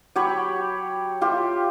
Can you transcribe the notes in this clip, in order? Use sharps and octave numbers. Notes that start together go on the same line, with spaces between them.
F#3 G4 C#5 B5
F4 G4 E5